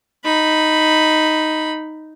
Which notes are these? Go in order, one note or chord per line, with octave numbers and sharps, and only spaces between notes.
D#4 B5